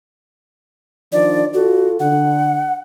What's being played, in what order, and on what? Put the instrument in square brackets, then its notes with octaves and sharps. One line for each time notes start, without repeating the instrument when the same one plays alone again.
[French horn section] D#3 F3 D4 [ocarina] D5
[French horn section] F4 A4 [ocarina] F#4
[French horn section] D3 [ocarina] F#5